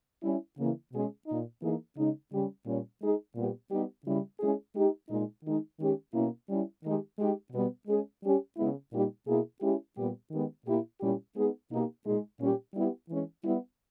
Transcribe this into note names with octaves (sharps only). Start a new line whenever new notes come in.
G3 C#4 E4
C#3 E3 A#3 E4
B2 G#3 C#4 G#4
A#2 A#3 D#4
E3 A#3 D#4 G#4
C#3 G#3 D#4
C#3 G3 C#4 G4
A#2 G3 C#4
G#3 D#4 G#4
A#2 G3 B3 G4
G3 B3 D#4 G4
C#3 G3 C#4 E4
G#3 C#4 E4 G#4
G#3 D#4 G4
A#2 G#3 D#4
D#3 G#3 D#4
D#3 G#3 C#4 G4
B2 A#3 C#4 E4
G3 C#4 E4
D#3 G#3 D#4 G4
G#3 D#4 G4
B2 G3 B3
G#3 C#4 G#4
G3 C#4 G4
C#3 G#3 B3 E4
A#2 G3 A#3 D#4 G4
B2 A#3 E4 G#4
G#3 C#4 E4 G4
A#2 G3 B3 G4
D#3 G#3 B3 G4
A#2 A#3 E4 G4
A#2 G3 C#4 E4 G4
G#3 B3 D#4 G#4
B2 A#3 D#4 G4
A#2 G#3 D#4 G#4
A#2 G3 C#4 G4
G3 B3 E4 G4
E3 G#3 C#4
G3 B3 E4